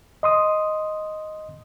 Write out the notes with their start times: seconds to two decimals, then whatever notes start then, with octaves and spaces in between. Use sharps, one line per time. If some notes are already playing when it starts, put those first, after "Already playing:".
0.23 D#5 C6 D#6